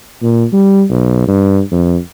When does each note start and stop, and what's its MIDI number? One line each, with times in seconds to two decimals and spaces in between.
0.23 0.44 46
0.53 0.84 55
0.90 1.23 35
1.28 1.61 43
1.72 1.97 41